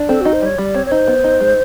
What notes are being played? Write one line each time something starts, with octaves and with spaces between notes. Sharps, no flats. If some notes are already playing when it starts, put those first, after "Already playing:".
Already playing: D4
C4 A4
D#4 F#4
C5
G3 C#5
G3 D5
C4 C#5
C#5
D#4 C5
B3
D#4
G#3